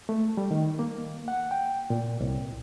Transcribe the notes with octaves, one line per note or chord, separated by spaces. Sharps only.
A3
G3
D#3
A#3
F#5
G5
A#2
C2